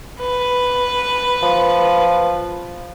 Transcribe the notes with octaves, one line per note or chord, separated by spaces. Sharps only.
B4
F3